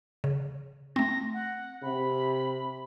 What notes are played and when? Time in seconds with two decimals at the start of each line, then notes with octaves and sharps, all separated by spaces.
0.24 C#3
0.96 A3 C4 A#6
1.33 F#5
1.83 C3 B5